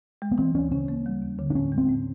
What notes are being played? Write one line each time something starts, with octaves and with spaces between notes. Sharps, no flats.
G#3
B3
E3 C4
D2 C#4
C#3 C#4
A#3
G3
D#2
D3
D4
A2 C#4
G#3
C4
A2